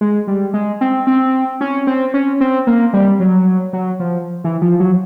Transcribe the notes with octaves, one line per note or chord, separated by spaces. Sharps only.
G#3
G3
G#3
C4
C4
C#4
C4
C#4
C4
A#3
G3
F#3
F#3
F3
E3
F3
F#3